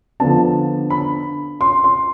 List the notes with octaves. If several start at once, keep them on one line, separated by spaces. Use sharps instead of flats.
D3 F3 B3 D4 A5
B5
C6
C6